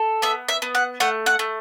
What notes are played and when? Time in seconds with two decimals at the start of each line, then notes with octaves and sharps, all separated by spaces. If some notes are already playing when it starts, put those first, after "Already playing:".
Already playing: A4
0.22 B3 E5
0.49 E5
0.62 B3
0.75 F#5
1.00 A3 F#5
1.26 F#5
1.39 A3